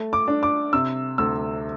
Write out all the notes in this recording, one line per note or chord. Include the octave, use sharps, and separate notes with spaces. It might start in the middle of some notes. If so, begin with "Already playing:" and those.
Already playing: A3
D6
D4
D6
C3 E6
D2 E6